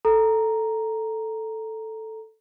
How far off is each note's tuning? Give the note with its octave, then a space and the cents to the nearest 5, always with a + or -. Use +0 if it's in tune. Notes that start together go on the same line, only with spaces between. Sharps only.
A4 +0 A#5 +0